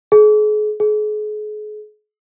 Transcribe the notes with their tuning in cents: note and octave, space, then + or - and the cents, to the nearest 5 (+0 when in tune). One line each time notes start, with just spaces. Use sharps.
G#4 +40
G#4 +40